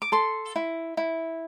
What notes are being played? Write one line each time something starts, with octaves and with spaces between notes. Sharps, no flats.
D6
A4 C6
E4
E4